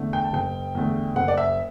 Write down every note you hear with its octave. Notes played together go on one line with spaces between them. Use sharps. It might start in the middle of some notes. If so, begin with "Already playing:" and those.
Already playing: E2 D3 A3
G5
A5
F#1 G5
E2 D3 A3
F#1 F#5
D5
E5